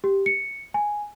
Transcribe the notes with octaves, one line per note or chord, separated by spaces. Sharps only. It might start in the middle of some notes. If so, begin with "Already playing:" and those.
G4
C#7
G#5